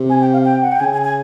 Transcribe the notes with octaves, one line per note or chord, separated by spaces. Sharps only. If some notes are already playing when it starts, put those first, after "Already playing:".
Already playing: C3
G#5
G5
F5
G5
F#5
G5
C#3 G#5
G#5
G#5